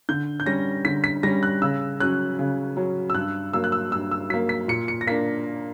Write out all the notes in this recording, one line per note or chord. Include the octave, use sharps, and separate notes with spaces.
D3 G6
G6
G3 C#4 A#6
D3 B6
B6
G3 C#4 A#6
F#6
C#3 E6
F#3 C#4 F#6
C#3
F#3 C#4
E6
G2 F#6
F#3 A#3 E6
F#6
E6
G2 E6
E6
F#3 A#3 B6
B6
A#2 C#7
C#7
A#6
A#3 D4 B6